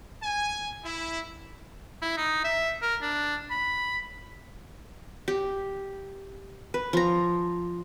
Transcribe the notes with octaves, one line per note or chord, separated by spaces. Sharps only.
G#5
E4
E4
D#4
E5
A#4
D4
B5
G4
B4
F3 A#5